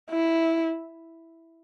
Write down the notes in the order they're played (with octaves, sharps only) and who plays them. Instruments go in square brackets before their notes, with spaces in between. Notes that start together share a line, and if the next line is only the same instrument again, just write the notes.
[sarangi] E4